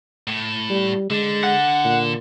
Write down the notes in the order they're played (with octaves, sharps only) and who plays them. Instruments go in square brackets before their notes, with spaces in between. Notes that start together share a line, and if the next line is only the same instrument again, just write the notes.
[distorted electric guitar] A2
[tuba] G3
[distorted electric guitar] D3 [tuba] G#3
[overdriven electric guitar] F#5
[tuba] A#2